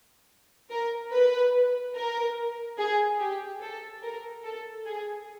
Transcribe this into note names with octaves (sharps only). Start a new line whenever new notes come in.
A#4
B4
A#4
G#4
G4
A4
A#4
A4
G#4